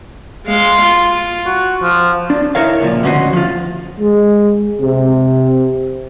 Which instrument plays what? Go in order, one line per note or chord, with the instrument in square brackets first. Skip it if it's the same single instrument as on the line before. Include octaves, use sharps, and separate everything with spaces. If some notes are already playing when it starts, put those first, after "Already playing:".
[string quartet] G#3 F5 C6
F4
[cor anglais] F#4
F3
[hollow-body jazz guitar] D4
D#4 E4 A#4 C#5 F5
C#2 A#2 F3
D2 G#2 C#4 F#4 C5 D#5
F3 F4
[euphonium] G#3
C3